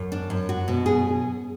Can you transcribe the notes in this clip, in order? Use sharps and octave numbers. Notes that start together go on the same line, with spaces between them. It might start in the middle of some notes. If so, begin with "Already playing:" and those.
Already playing: F#2
D4
F#2
F#4
B2
G#4